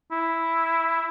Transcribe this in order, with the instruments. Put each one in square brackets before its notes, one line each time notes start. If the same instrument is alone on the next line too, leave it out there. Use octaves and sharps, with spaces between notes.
[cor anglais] E4